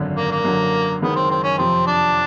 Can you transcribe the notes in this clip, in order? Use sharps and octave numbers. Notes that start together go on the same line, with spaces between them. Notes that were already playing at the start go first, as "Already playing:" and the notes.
Already playing: G#1 F#2 D3
A#3
A#3
F#2 D3 F#3
F#1 F#2 D#3 G#3 B3
C4
C4
C#4
F2 C3 F3 C4
D4